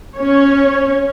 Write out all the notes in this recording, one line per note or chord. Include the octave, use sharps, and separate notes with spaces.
C#4 C#5